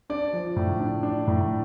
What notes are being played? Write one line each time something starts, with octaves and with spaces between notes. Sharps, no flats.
D4 D5
F3
A2
D4
D4
A2